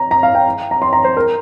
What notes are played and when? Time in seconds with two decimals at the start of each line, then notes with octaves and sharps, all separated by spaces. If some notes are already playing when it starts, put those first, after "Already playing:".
Already playing: A#5
0.11 A#5
0.23 F5
0.35 G5
0.71 A#5
0.82 C6
0.93 A#5
1.04 C5
1.17 A#4